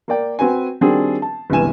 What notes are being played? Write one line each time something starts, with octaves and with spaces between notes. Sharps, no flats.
A#3 A#4 D5 G5
C4 F#4 B4 G#5
D#3 G3 C4 D4 F#4 G#4
A5
G1 C#2 C3 E3 G#5 E7